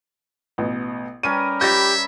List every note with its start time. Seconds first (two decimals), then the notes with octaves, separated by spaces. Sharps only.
0.58 A1 B2
1.23 G3 C#4 A#4 D#7
1.61 G4 C#5 E5 G6 A6 A#6